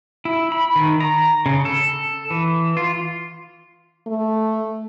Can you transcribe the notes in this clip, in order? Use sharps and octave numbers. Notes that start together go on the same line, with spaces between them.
E4
B5
D#3
A#5
C#3
A4
E3
F4
A3